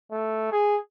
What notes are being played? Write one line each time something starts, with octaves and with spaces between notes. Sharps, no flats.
A3
G#4